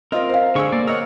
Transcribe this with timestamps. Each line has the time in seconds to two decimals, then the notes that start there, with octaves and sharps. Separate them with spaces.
0.12 C4 F4 A#4 D#5
0.29 C5 F5
0.55 D3 G#3 G#4 C#6 E6
0.72 A#3 D5
0.87 A#4 C#5 D#5 F#5 E6